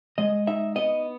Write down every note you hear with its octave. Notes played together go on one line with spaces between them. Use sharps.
G#3 D#5
D#4 E5
B3 D#5